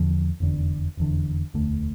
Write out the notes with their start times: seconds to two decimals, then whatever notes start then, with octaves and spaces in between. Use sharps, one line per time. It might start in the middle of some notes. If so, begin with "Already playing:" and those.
Already playing: E2 D3 F3
0.40 F1 E2 D3
0.97 F1 E2 D3
1.54 E1 D2 D3 A3